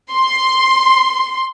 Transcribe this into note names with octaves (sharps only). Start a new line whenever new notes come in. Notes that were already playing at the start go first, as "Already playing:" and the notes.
C6